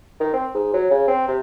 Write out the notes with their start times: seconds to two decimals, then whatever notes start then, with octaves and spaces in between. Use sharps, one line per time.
0.20 D#3
0.33 C4
0.54 G#2
0.74 F#3
0.90 C#3
1.08 C4
1.28 C3